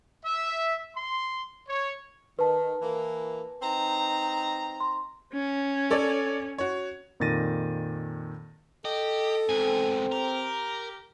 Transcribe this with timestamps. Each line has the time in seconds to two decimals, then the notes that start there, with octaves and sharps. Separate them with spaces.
0.24 E5
0.96 C6
1.68 C#5
2.39 D#3 B4 A5
2.82 E3 A#3
3.62 C4 D#4 A#5
4.80 C6
5.34 C#4
5.91 A4 C#5 D5
6.58 F#4 C#5
7.20 F2 A#2 D#3 A6 A#6 D#7
8.85 G4 A4 D#5
9.49 E2 G#2 C4 G#5
10.12 G4 A#4